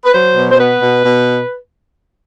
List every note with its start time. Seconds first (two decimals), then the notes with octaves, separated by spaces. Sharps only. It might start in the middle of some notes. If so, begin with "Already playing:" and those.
0.04 B4
0.13 F#3 C5
0.36 B2
0.50 C5
0.58 B3 B4
0.81 B2
1.04 B2